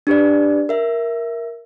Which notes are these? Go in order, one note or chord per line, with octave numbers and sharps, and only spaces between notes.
D4 G4 B4 D5
A#4 E5